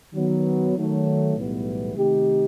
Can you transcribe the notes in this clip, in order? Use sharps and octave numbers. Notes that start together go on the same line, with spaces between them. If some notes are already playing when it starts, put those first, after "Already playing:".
D#3 F#3 B3
D#3 F#3 A3
B1 A2 E3 G3 B3
C3 D#3 A3 D#4 G4